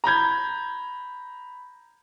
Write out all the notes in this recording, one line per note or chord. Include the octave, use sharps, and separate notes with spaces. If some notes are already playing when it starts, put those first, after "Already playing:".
A#5 B5 G6 G#6